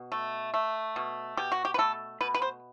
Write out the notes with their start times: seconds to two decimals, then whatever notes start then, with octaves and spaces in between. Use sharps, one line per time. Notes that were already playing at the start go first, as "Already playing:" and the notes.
Already playing: B2
0.12 A3
0.54 A3
0.96 B2
1.37 B2 G4
1.52 F#4
1.65 G4
1.74 B4
1.78 A3 A4
2.21 B2 B4
2.35 B4
2.42 C5